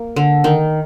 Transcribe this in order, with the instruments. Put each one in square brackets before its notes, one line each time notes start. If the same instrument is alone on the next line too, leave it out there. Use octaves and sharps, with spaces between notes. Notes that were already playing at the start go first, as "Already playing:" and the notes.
Already playing: [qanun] A#3
D3
D#3